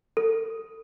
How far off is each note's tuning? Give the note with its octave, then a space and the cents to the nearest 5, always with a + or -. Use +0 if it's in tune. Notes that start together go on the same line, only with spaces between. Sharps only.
A4 +35